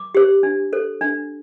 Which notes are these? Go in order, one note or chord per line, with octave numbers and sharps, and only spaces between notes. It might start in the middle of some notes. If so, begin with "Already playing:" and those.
Already playing: D6
G4 C5
D4
A4 C5
D4